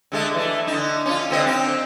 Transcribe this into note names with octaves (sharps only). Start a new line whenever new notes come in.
D3 G#3 A3
E3 A3
D3 D#4
C#4 F4
D3 C4 D#5
C4 D#4